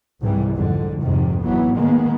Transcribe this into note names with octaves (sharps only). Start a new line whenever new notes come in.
C2 G#2 C3 E3 G3
F2 G#2 D3
F1 F2 G#2 C3 D#3
G#1 E3 F#3 B3
D#3 G#3 A#3 B3